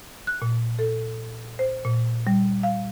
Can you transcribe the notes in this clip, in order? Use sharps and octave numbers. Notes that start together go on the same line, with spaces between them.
F#6
A#2
A4
C5
A#2
G3
F5